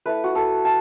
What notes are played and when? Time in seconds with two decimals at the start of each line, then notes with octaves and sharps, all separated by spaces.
0.06 A3 E4 B4
0.24 F#4
0.35 A4
0.65 A5